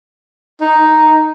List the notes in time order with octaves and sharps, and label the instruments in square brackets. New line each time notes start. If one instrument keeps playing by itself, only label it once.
[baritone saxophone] D#4